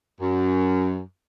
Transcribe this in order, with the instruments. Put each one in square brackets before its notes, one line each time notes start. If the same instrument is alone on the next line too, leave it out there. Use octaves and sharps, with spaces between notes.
[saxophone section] F#2